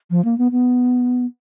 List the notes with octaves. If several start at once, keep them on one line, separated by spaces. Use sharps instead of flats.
F3
A#3
B3
B3